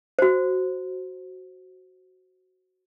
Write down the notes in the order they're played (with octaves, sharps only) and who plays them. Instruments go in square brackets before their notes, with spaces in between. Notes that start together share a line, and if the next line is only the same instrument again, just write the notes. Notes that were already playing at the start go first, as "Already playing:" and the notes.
[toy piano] F#4 C5